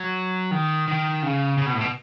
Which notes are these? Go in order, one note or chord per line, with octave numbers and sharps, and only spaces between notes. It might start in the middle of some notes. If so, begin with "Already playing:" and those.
Already playing: F#3
D#3
D#3
C#3
C#3
B2
A2
B2